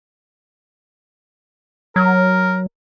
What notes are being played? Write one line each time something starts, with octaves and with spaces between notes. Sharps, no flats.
F#3 A#4